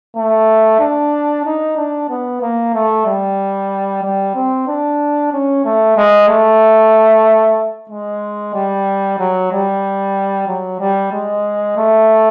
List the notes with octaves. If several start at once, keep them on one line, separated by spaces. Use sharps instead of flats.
A3
D4
D#4
D4
B3
A#3
A3
G3
G3
C4
D4
C#4
A3
G#3
A3
G#3
G3
F#3
G3
F#3
G3
G#3
A3